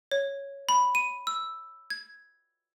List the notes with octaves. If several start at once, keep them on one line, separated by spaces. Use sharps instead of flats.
C#5
B5
D#7
E6
G#6